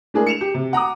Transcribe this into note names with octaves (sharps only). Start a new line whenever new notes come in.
G#3 A3 D4 E4 G#4 A#4
C#7 E7 F7
G4
C3
F#5 A#5 D6 D#6